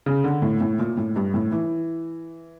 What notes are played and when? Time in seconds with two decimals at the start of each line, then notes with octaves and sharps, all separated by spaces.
0.06 C#3
0.24 D3
0.42 A2
0.61 A2
0.79 A#2
0.97 A2
1.16 G2
1.34 A2
1.52 E3